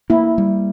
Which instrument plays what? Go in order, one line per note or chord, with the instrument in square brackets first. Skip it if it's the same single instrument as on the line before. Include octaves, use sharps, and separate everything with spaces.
[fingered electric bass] A#3 [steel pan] E4
[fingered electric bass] G3